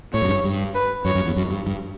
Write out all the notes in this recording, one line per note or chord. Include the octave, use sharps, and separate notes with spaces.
A2 C#5
F#2
G2
G2
B4
F#2 C#5
F#2
E2
F#2
G2
G2